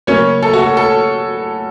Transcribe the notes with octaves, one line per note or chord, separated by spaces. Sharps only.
C#3 F#3 A#3 C#4 C#5
A4
F#4
A4
A4